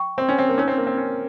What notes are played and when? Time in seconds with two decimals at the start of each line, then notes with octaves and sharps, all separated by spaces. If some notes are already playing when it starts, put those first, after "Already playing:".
Already playing: G5 C#6
0.18 C4
0.29 C#4
0.38 C4
0.49 A#3
0.58 C#4 D#4 A#4 C#5
0.68 C4
0.78 A#3
0.87 C4
0.97 C#4